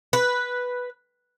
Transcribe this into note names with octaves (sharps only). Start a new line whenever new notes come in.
B4